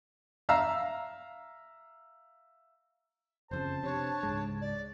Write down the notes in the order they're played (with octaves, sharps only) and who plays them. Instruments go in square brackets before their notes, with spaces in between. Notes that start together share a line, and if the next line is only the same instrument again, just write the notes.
[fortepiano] E5 F5 A#5 E6
[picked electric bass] F#1 F2 C#3 [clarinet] C5 [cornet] A5
[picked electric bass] C3 [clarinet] D4 [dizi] C#5
[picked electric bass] C#2 G#2 G#3
[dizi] D5